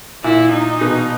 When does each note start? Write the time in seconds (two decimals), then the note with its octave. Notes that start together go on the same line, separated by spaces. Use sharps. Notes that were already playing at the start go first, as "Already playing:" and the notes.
0.24 A#2 E4
0.52 D#4
0.81 B2